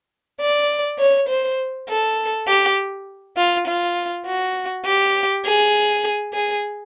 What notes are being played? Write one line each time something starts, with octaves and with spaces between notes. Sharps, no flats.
D5
C#5
C5
A4
G4
F4
F4
F#4
G4
G#4
G#4